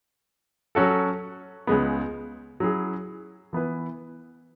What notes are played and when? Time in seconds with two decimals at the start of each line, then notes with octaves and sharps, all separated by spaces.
0.75 F#3 C#4 F#4 A4
1.67 C#2 C#3 G#3 B3
2.60 F#3 C#4 E4 G#4
3.53 E3 B3 E4 B4